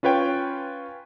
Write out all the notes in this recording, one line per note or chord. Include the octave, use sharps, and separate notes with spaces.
C#4 F4 B4 C#5 G5